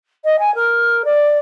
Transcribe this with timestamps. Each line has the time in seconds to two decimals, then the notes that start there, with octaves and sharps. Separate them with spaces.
0.25 D#5
0.39 G#5
0.55 A#4
1.05 D5